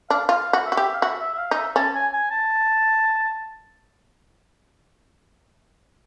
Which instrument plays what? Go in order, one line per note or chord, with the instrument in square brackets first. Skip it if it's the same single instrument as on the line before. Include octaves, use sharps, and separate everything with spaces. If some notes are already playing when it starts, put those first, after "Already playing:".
[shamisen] D4 [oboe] F5
[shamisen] F4 [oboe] F5
[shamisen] F#4
[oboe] E5
[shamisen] F#4
G4
[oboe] F5
[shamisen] F#4 [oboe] E5
[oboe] E5
E5
F5
[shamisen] D#4
[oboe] E5
[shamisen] C#4 [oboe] A5
[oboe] G#5
G#5
A5